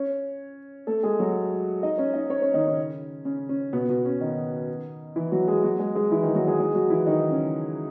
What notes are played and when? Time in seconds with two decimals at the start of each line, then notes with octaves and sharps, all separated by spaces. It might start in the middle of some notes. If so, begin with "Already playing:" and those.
Already playing: C#4 C#5
0.87 A3 A4
1.03 G#3 G#4
1.19 F#3 F#4
1.83 D#4 D#5
1.98 C#4 C#5
2.14 D#4 D#5
2.30 C#4 C#5
2.42 C#4 C#5
2.54 D#3 D#4
2.66 C#3 C#4
3.25 C#3 C#4
3.49 C#3 C#4
3.73 B2 B3
3.89 B2 B3
4.05 C#3 C#4
4.20 D#3 D#4
5.16 E3 E4
5.31 F#3 F#4
5.48 G#3 G#4
5.64 F#3 F#4
5.79 G#3 G#4
5.95 G#3 G#4
6.11 E3 E4
6.23 D#3 D#4
6.35 F#3 F#4
6.47 G#3 G#4
6.59 G#3 G#4
6.75 F#3 F#4
6.90 E3 E4
7.06 D#3 D#4
7.30 C#3 C#4